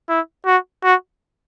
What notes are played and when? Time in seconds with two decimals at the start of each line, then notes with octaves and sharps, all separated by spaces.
0.09 E4
0.46 F#4
0.83 F#4